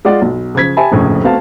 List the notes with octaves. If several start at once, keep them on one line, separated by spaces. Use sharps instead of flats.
G#3 F4 D5 F#5
B1
C#3 F3 G#6 B6
G4 E5 G#5 A5 B5
F1 A#1 F2 A2 C#3
A3 B3 C4 F#4 F5 A5